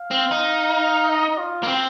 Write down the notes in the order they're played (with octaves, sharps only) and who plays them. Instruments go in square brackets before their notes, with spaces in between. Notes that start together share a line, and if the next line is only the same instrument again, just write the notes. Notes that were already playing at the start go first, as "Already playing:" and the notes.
Already playing: [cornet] F5
[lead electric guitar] C4
D#4
[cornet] D#5
F4
[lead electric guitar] A#3
C4